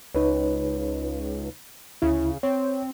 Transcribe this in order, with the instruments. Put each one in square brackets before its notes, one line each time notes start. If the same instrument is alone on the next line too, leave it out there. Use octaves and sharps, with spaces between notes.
[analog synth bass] C#2 [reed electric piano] D#4 B4 C#5
[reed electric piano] D2 E4 [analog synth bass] C#3
[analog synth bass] C4 [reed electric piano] C#5